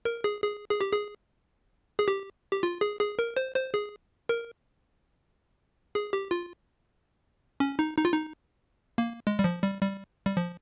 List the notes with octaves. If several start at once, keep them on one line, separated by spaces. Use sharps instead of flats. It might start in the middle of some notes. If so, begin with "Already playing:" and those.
A#4
G#4
G#4
G#4
G4
G#4
G#4
G4
G4
F4
G#4
G#4
A#4
C5
C5
G#4
A#4
G#4
G4
F4
C#4
D#4
D#4
F4
D#4
A#3
G#3
G3
F3
G3
G3
G3
F3